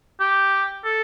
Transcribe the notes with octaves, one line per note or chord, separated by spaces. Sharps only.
G4
A4